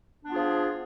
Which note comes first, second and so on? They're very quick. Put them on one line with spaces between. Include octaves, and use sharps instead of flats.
D4 B3 F4 G#4 F3